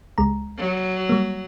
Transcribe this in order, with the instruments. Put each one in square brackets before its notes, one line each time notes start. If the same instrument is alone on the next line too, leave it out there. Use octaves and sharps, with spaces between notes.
[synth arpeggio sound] C#2 G#3 A#5
[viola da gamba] F#3
[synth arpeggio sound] G3 A#3